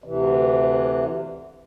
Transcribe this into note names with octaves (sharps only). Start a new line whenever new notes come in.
D2 C3 E3